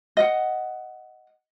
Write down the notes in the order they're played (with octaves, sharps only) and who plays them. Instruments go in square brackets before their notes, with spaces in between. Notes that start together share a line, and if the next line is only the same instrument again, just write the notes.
[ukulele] D#5 F#5